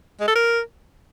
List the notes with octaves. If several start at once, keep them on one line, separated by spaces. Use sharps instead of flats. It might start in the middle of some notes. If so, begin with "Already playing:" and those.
G#3
A4
A#4